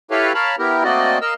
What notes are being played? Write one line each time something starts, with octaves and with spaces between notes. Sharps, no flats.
E4 G4 A4 B4 C#5 F5
A#4 C#5 F5 A5 B5
B3 E4 G4 A#4
A3 A#3 C4 F#4 D5 D#5
A#4 D#5 F5 E6